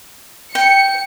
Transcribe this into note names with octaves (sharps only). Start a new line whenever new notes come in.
G5 C#7